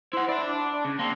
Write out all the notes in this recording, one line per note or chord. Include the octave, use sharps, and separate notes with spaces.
E4 C5 F#5
E4 D5 A5
D4
D4
C#3
A#3 C4 D4